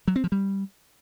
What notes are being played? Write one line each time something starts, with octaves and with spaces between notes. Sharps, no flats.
F#3
C4
F3
G3